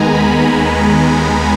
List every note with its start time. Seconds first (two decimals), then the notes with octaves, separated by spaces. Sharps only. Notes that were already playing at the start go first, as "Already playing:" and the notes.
Already playing: D#2 D#3 G#3 B3 G#5 A#5
0.14 B5